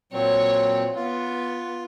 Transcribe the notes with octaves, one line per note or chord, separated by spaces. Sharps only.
A#2 F#3 C4 C#5
B3 F4